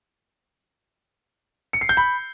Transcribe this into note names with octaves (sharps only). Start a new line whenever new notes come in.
C#7
C7
G6
B5